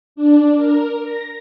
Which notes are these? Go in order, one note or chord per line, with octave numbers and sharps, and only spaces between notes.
D4
A#4
A#6